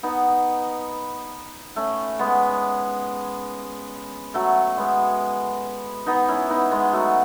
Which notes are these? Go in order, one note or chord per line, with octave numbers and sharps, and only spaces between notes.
B3 D#4
A3 C#4
G#3 B3
F#3 A3
G#3 B3
B3 D#4
C#4 E4
B3 D#4
G#3 B3
F#3 A3